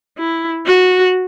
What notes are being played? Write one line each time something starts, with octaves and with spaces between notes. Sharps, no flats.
E4
F#4